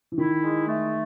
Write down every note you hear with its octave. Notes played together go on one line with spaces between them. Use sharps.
E3
D#3 E4
G#3
A3